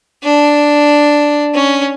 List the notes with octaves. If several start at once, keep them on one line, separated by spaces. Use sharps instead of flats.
D4
C#4